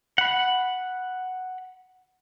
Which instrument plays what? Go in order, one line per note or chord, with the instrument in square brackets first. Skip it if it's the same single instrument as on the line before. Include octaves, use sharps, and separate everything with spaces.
[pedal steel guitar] F#5 B5